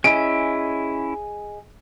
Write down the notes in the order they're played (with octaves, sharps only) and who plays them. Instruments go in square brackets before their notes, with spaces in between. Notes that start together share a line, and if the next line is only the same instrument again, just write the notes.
[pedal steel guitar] C#4 E4 [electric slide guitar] G#4 D#5 [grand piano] D7